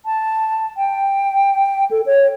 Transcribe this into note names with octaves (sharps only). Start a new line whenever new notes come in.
A5
G5
A4
C#5